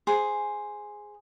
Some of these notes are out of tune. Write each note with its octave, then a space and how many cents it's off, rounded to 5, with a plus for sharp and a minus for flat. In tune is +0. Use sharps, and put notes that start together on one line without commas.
G#4 +0 C5 +0